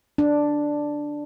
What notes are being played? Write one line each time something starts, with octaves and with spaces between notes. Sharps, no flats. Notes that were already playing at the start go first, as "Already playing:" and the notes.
D4